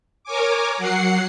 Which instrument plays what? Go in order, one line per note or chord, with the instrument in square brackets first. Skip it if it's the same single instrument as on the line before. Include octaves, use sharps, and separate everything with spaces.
[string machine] A#4 C#5 G#5 D6
F#3 F#5 C7 C#7